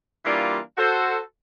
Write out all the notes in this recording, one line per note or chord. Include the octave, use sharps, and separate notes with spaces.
E3 G3 A#3 D4 F4
F#4 A4 C5